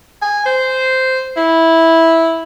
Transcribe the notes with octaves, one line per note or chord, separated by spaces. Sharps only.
G#5
C5
E4